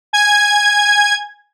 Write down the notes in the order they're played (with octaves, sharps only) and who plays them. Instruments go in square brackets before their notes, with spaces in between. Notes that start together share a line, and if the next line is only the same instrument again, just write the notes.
[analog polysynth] G#5 G#6